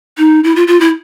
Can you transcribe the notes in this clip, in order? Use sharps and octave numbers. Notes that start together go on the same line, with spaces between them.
D#4
E4
F4
F4
E4